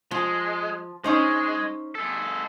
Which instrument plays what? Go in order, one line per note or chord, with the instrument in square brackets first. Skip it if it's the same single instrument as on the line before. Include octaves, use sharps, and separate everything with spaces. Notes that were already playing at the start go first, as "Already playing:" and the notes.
[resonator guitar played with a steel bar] F3 [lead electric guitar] G#3
[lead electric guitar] G#3 [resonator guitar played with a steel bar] C#4 D#4 C5
[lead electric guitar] G#3 A4